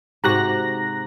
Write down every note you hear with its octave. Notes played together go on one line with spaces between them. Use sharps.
G#2 C3 F#4 A#5 F#6 A#6